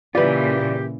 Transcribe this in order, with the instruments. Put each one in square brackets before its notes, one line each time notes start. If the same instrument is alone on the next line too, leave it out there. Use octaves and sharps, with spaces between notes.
[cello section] A#2 C#3 E3 [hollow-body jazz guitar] F4 B4 [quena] G4 [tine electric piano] D5